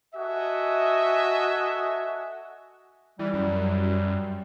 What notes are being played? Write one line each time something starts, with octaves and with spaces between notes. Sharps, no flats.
F#4 A4 D#5 E5 F#5 G#5
E3 G3
F#2